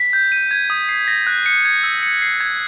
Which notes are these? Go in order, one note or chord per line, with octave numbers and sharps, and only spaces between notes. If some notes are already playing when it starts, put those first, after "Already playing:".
Already playing: B6
G6
D#7
G#6
D#6
C7
A#6
F#6
C#7
G#6
E6
C#7
C7
G#6